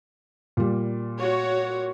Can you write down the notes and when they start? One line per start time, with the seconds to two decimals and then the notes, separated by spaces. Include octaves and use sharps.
0.57 A#2 G3
1.19 F#4 C#5